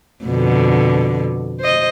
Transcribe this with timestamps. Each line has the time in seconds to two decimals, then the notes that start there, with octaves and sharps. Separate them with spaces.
0.24 F2 B2 D3
1.60 C5 D#5